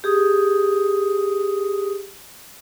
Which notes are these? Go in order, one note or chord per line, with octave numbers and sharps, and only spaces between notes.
G4 G#4 D#6